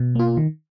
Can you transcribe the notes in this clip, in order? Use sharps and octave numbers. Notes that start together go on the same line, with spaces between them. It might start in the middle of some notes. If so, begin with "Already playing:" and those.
Already playing: B2
A#3 F4
D#3